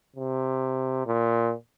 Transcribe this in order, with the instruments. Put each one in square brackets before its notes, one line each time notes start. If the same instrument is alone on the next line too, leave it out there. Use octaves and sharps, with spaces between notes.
[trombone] C3
A#2